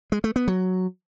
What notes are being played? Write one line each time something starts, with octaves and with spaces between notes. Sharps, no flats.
G#3
A3
B3
F#3